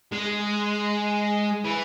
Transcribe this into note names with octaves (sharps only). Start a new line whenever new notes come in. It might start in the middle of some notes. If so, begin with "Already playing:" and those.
G#3
E3